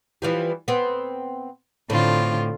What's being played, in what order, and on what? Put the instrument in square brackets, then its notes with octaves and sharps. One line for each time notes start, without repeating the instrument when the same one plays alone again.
[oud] E3 F3 G3
B3 C4
[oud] A2 [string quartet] D3 C4 F4